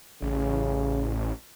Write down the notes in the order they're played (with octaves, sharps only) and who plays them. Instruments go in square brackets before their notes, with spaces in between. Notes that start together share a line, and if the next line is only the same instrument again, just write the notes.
[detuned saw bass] A1 [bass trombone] C#3